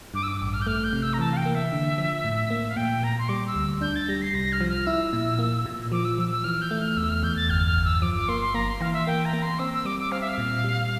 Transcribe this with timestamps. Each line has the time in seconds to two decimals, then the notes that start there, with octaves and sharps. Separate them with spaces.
0.14 G2 D6
0.23 E6
0.28 D6
0.40 A1 D6
0.53 F6
0.61 G6
0.67 A3 F6
0.84 G6
0.93 C3
1.02 E6
1.13 A#5
1.19 E3 A5
1.32 F5
1.36 G5
1.46 A#3
1.55 E5
1.72 D3
1.98 F3
2.24 A2
2.50 A#3
2.69 F5
2.76 A#2 G5
3.03 A#2 A#5
3.18 C6
3.29 G3 D6
3.47 E6
3.55 D2
3.81 D4 G6
3.95 A6
4.08 G3 A#6
4.21 C7
4.34 C2 A#6
4.52 F6
4.61 F3
4.69 F6
4.86 E4 E6
5.13 A#2
5.39 A#3
5.66 A#2
5.92 F3 D6
6.04 E6
6.18 F3 E6
6.31 E6
6.44 E3 F6
6.61 G6
6.71 A3
6.80 F6
6.97 E2 E6
7.09 F6
7.23 E2 G6
7.36 A6
7.49 G1 F6
7.66 F6
7.75 G1
7.84 E6
8.02 F3 D6
8.15 D6
8.28 A#3 C6
8.42 C6
8.54 A#3 A#5
8.68 C6
8.81 E3 F5
8.93 E5
9.07 A#3 G5
9.25 A#5
9.33 A#3
9.42 C6
9.59 C4 E6
9.73 E6
9.85 G3 D6
9.99 D6
10.11 C4 F5
10.21 E5
10.28 F5
10.38 A#2
10.64 G3